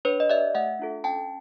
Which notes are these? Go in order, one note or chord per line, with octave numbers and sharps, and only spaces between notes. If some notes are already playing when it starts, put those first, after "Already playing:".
D4 B4 C#5
D#5
G4 D5 E5
A3 E5 F#5
D4 F4 A4
C#4 G5 A5